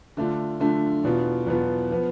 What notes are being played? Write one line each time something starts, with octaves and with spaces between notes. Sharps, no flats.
D3 A3 D4 F4
D3 A3 D4 F4
E2 B2 B3 F4
E2 B2 B3 F4
F3 B3